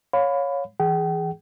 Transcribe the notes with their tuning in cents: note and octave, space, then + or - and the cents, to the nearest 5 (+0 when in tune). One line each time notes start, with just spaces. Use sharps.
C#5 +0 F5 +25 B5 +20
E3 +0 G#4 +0 G5 -40